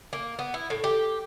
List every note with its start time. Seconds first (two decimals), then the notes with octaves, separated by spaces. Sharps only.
0.13 A#3
0.39 B3
0.54 E4
0.70 A2
0.84 G4